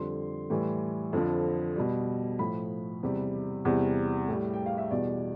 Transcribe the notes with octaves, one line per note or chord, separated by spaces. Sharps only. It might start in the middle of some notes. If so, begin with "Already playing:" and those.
Already playing: F2 D3 G3 C6
A2 E3 G3
F2 D3 F3
B2 G3
A2 F3 B5
E2 C3 G3
E2 C3 G3
A2 G3
G5
F5
E5
E2 B2 G3 D5